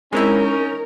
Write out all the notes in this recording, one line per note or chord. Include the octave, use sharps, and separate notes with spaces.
G#3 C4 C#4 D#4 E4 A#4